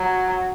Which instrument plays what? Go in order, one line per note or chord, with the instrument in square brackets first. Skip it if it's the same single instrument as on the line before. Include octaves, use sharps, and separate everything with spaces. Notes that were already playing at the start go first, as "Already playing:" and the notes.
Already playing: [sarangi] F#3